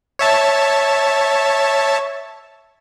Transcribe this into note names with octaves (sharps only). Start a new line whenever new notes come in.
C#5 E5 A5